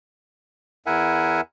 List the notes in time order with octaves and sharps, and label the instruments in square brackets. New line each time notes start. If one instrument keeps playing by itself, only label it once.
[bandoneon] E2 E4 A#4 E5 F#5 G#5